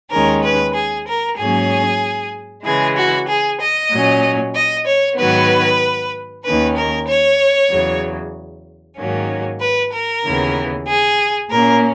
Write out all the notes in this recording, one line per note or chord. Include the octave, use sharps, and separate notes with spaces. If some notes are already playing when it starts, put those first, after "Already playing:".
D#2 D#3 G#3 C#4 A#4
B4
G#4
A#4
G#2 F#3 A#3 C#4 G#4
C#3 E3 G#3 G#4
F#4
G#4
D#5
A#2 F#3 C#4
D#5
C#5
G#2 D#3 F#3 B3 B4
D#2 D#3 A#3 C#4 B4
A#4
C#5
E2 C#3 F#3
G#2 D#3 F#3 A#3 C#4
B4
A#4
D#2 C#3 E3 B3
G#4
A#2 A#3 C#4 A#4